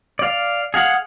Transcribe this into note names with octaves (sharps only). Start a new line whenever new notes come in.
D5 F5
G#4 F5 F#5